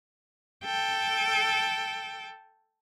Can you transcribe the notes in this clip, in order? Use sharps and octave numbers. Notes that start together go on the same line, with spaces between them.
A4 G5